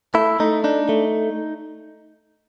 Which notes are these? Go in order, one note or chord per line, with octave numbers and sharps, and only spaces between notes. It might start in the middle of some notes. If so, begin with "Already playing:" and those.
A3 E4
A3 D#4
D4 D#4
A3